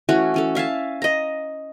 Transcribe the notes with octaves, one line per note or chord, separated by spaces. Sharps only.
E3 A3 C#4 F#4
E3 C#4 A4
E5 F5 G#5 A5
D#5 A#5